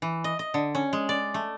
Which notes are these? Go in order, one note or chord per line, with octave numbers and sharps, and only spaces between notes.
E3
D#5
D#5
D3
C#4
G#3
D5
A3